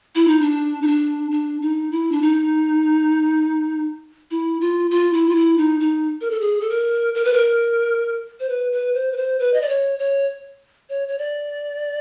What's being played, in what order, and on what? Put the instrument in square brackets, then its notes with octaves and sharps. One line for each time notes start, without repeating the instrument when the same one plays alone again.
[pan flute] E4
D#4
D4
D#4
D4
D4
D#4
E4
D4
D#4
E4
F4
F4
E4
F4
E4
D#4
D#4
A#4
A4
G#4
A4
A#4
A#4
B4
A#4
C5
B4
B4
C5
B4
C5
B4
D#5
D5
C#5
C#5
C#5
C#5
D5